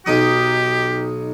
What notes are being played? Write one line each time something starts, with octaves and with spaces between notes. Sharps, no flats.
B1 D#4 G4 D#6